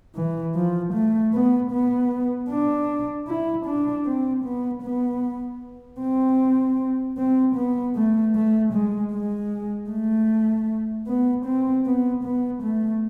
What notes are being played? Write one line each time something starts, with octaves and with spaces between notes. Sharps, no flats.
E3
F3
A3
B3
B3
D4
E4
D4
C4
B3
B3
C4
C4
B3
A3
A3
G#3
G#3
A3
B3
C4
B3
B3
A3